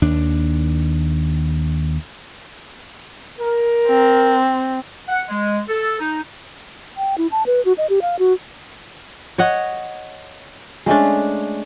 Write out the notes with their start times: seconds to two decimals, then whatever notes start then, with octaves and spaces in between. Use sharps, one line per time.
0.02 D#2 D4
3.39 A#4
3.87 C4
5.09 F#5
5.29 G#3
5.69 A4
6.00 D#4
6.97 G5
7.18 E4
7.32 A5
7.46 B4
7.65 F#4
7.78 D#5
7.90 G4
8.02 F5
8.19 F#4
9.38 C#5 D#5 F#5
10.86 G#3 A3 C#4 D4